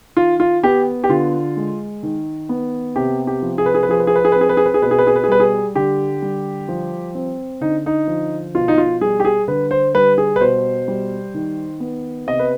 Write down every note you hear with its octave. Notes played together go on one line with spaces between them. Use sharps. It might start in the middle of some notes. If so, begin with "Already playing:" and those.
D#3 F4
F4
B3 G4
G4
D3 F4
G#3
D#3
B3
C3 G4
G4
F3
G#4
B4
G#4
B4
F3 G#4
B4
G#4
B4
G#4
B4
C4
G#4
B4
G#4
B4
G#4
B2 B4
G#4
B4
G#4
B4
G#4
G3 B4
G#4
D3 G4
G3
F3
C4
D3 D#4
D#4
F3
B2 F4
D#4
F4
G3 G#4
G4
G#4
D3 B4
C5
G3 B4
G#4
B4
B2 C5
G3
D#3
B3
C3 D#5
B4